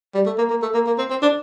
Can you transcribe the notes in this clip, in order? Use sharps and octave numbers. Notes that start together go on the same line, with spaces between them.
G3
A3
A#3
A#3
A3
A#3
A#3
C4
C4
D4